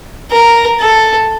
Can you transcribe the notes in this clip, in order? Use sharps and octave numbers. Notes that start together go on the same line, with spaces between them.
A#4
A4